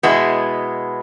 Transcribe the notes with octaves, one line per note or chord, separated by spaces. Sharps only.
B2 G#3 B3 E4